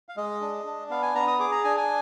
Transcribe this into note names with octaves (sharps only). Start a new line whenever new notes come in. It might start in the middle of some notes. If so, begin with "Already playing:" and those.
F5
G#3 D#5
D4
D4
B3 F5
G#5
B3 A#5
D#6
G#4 D6
A#5
D4 G#5
G#5